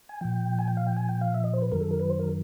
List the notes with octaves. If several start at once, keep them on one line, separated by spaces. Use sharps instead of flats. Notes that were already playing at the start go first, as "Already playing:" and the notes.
G#5
A#2 F3 G5
G#5
G5
F5
G5
G#5
G5
F5
E5
D#5
C5
B4
F#2 D#3 F#3 A#4
A4
A#4
B4
C5
A#4